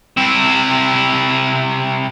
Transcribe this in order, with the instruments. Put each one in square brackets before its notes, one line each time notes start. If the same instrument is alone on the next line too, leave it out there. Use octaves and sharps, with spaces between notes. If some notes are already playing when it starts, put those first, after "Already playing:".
[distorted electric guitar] C3 E4